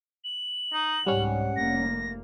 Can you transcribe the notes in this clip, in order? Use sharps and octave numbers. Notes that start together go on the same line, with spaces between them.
F#7
D#4
C2 G#2 G3 C#4 F#5
F1 A#3 A#6